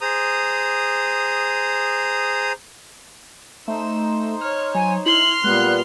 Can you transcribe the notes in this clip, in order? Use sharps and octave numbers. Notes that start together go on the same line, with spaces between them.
G#4 C5 A#5 D#6
A3 D#4 C5 E6
C#5 F6
F#3 G#5
E4 C6 F6 F#7
A#2 G3 G#3 B3 F#6